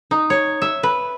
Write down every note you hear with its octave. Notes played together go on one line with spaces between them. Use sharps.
D#4
C#5
E5
B4